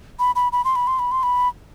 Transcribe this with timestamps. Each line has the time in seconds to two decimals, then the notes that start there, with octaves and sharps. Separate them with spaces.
0.19 B5
0.35 B5
0.52 B5
0.65 C6
0.76 B5
0.87 C6
0.99 B5
1.12 C6
1.23 B5